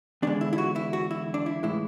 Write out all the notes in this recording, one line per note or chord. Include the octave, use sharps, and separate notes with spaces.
E2 D3 G#3 D4
E4
E4
F#4
E4
F#4
E4
D4
E4
A2 E3 G#3 E4